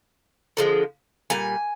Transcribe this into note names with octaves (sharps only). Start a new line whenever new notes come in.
D3 F3 G#3
A#2 G3 G#5